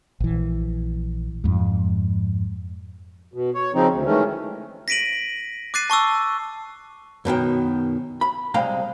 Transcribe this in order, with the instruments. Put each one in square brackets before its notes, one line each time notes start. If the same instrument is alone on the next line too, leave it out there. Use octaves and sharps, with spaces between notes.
[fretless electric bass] A#1 E3
F2 G#2
[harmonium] B2
C#5
C#3 F3 C4 D#4
D2
D#3 E3 G#3 A3 C#4
[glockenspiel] A#6 B6 D7 D#7 F#7
D6 F#6 A6 C7 D#7
A5 C#6 D6 E6
[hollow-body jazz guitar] F#2 B2 D#3 G5
B5
C2 G#3 F5 G5 A#5